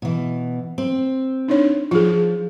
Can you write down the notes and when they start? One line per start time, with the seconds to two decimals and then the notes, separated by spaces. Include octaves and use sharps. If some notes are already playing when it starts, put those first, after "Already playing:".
0.02 B2 E3
0.78 C4
1.48 D4 D#4 C#5
1.91 F3 F4 G#4